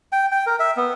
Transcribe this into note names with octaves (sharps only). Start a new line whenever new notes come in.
G5
G5
A#4
E5
B3